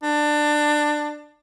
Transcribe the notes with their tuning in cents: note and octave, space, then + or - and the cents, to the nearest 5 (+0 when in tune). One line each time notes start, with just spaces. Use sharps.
D4 +20